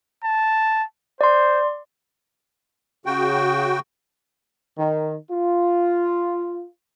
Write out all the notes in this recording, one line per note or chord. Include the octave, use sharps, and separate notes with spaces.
A5
C5 D5 C6
C#3 F#4 G5
D#3
F4